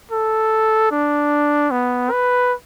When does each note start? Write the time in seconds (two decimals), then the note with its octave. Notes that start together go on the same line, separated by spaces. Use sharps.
0.12 A4
0.91 D4
1.71 B3
2.12 B4